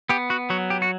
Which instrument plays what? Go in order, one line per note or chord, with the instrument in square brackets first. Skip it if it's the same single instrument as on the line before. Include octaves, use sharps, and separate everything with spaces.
[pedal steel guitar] B3 G4
F#4
F#3 F#4
G4
F#4